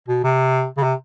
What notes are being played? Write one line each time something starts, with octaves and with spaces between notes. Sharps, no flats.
B2
C3
C#3
C3